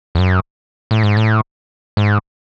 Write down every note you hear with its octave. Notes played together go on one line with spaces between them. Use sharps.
E2
F#2
A2
G#2
A2
G#2